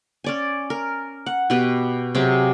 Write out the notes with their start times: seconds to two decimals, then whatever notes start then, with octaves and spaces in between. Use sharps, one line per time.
0.24 C#4 D5 G#5
0.70 A#4
1.26 F#5
1.50 B2 B3 G4 B4
2.15 C3 F#3 G4 G#4